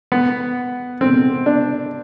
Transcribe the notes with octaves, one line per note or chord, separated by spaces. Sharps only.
B3
C4
D4